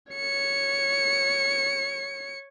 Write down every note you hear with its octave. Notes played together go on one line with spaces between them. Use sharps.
C#5 C#7